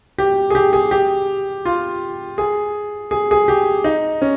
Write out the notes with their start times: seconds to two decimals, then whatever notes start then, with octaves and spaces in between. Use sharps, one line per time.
0.18 G4
0.50 G#4
0.55 G4
0.73 G#4
0.91 G4
1.65 F4
2.38 G#4
3.11 G#4
3.31 G#4
3.48 G4
3.84 D#4
4.22 C#4